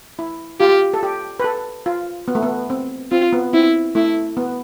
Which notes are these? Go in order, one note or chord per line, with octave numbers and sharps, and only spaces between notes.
E4
F4 G4
A4
G4
B4
A4
F4
B3
A3
B3
C4
C4 F4
B3
C4 E4
A3 E4
B3